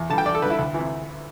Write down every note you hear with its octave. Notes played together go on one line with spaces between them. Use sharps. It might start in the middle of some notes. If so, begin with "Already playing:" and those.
Already playing: E2
D3 G3 A5
G5
E2 D5
A4
D3 G3 B4
E4
D2
C3 E3